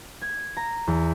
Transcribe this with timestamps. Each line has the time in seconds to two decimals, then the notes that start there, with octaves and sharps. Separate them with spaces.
0.22 G#6
0.57 A#5
0.87 E2